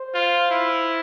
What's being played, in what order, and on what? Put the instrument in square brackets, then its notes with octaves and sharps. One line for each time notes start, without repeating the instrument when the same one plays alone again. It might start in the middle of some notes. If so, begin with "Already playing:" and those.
Already playing: [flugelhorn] C5
[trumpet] F4
E4